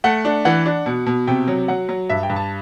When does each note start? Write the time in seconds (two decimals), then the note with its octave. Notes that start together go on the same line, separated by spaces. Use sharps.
0.04 A3 F#5
0.25 D4
0.45 E3 F#5
0.66 D4
0.86 B2
1.06 B2
1.27 C3 G5
1.48 F#3
1.68 F#3 F#5
1.89 F#3
2.09 G2 E5
2.23 G5
2.30 G2
2.36 A5